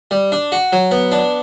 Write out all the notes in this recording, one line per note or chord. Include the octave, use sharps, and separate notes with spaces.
G3
D4
F#4
F#3
B3
D4